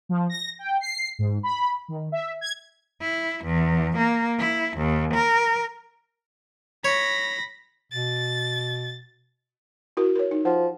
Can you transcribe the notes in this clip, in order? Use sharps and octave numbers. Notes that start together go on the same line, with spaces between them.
F3
A#6
G5
C7
G#2
B5
D#3
E5
G#6
E4
E2
A#3
E4
D#2
A#4
C#5 B5 A#6
B2 A6
E4 F#4 A#4
A#4 C#5
D#4
F3 F#5